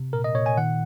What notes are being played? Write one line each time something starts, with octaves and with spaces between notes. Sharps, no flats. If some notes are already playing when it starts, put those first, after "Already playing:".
Already playing: C3
A#2 A#4
D#5
A#2 C#5
G#5
D#3 F#5